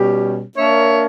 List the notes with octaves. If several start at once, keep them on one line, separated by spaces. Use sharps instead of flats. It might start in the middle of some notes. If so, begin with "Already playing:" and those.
Already playing: B2 G3 C#4 G4
A#3 D4 A#4 C#5 E5